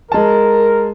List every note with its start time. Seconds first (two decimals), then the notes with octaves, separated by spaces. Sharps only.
0.12 G#3 A#4 A5